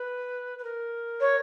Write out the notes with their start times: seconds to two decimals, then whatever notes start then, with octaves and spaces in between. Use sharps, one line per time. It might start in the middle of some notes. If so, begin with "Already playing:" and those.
Already playing: B4
0.59 B4
0.64 A#4
1.20 C#5